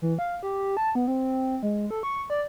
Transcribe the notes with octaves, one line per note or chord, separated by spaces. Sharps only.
E3
F5
G4
A5
B3
C4
G#3
A4
C#6
D5